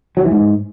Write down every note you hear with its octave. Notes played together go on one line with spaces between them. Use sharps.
F#3
E3
G#2